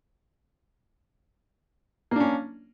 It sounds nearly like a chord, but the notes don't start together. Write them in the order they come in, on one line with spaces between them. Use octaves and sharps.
A#3 D4 C#4